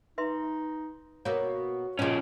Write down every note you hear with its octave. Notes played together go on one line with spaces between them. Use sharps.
D#4 B4 E5 C6
B2 A#3 F#4 A#4 C#5
A#2 C#3 F3 C#4 D#5